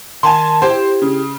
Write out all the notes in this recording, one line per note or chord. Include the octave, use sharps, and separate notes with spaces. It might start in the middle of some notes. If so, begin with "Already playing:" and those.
D#3 G#5 A5 C6
E4 G4 C5
C#3